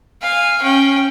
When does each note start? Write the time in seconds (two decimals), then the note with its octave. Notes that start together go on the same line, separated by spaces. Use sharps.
0.22 F5 G#5
0.62 C#4 G5